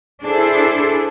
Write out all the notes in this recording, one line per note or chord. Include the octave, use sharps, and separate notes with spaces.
D4 E4 G#4 A4 C5